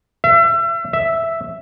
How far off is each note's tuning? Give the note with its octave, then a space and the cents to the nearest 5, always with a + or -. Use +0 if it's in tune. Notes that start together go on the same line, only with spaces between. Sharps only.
E5 +35
E5 +0